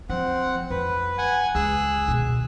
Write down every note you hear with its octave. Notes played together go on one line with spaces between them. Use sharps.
F3 C4 F#5
F2 B4
F#5 G#5
C#2 G#4 E6 F#6
B2 D#3